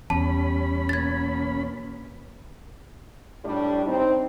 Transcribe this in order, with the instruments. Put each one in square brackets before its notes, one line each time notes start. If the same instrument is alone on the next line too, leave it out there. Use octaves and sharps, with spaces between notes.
[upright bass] E2 [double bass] G3 [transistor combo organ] C#4 B5 [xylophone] A5
[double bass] B2 A#3 [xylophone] G#6 A6
[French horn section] A2 G3 D4
C4 D#4